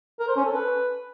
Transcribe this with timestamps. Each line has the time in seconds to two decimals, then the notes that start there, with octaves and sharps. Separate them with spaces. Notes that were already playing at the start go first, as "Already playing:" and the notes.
0.20 A#4
0.28 C5
0.36 C#4
0.45 A4
0.53 B4